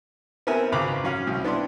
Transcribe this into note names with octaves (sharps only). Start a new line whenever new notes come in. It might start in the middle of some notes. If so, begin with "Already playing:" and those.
B3 C4 A#4 E5 G#5
G#1 C#3 A#5 B5 D6
F#3 C#4 F5
C2
B3 D4 E4 C6